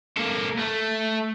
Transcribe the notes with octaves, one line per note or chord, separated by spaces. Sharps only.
A#3 A4
A3